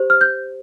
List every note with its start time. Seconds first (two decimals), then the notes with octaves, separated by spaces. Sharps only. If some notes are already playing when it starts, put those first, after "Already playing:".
Already playing: G4 C5
0.10 F6
0.21 G6